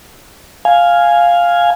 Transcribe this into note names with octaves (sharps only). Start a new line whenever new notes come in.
F5 G#5